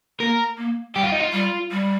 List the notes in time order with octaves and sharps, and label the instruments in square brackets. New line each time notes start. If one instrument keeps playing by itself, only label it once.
[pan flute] A#3 [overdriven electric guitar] A#4
[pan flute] A#3
[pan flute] G3 [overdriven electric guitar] G4
[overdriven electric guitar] F4
D#4
F4
[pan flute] G3
G3